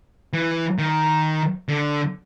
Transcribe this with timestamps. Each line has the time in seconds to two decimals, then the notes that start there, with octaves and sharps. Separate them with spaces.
0.33 E3
0.79 D#3
1.69 D3